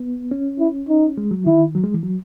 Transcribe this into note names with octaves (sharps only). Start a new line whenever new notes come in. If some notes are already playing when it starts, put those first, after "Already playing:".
Already playing: B3
C#4
E4
D#4
G#3
F#3
D#3 E4
F#3
G#3
E3
F#3